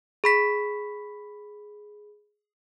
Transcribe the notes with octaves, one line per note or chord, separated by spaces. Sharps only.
G#4 B5 B6